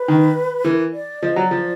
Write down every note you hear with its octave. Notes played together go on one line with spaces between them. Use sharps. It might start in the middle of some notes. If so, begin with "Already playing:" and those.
Already playing: B4
D#3
E3 A#4
D5
F3 D#5
F#3 D5
F3